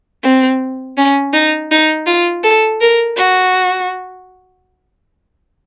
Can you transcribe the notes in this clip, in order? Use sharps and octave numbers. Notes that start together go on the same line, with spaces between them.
C4
C#4
D#4
D#4
F4
A4
A#4
F#4